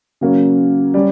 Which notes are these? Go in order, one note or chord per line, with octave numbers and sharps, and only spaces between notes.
C#3 F#3 A#3 C#4
G3 C#4